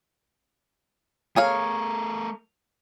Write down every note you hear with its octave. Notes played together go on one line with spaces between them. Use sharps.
A3 G#4 A#4 C#5 F5